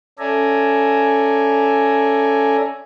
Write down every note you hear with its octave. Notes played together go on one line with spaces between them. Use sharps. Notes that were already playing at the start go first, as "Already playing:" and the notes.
C#4 A4 D5 E5 G#5 A#5